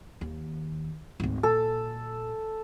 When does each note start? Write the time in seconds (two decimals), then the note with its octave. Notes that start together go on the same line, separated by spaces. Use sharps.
0.21 D#2
1.20 G#1 D2
1.43 A#2 A4